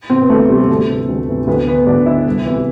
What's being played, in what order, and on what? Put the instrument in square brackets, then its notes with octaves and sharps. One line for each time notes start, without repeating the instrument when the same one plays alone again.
[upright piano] C3 E3 C4
B3
D2 A3
C3 E3 G3
D2 A3
C3 E3
D2
C3 E3
D2 B3
D3 B3
D2 D4
D3 E4
C2
C3 E3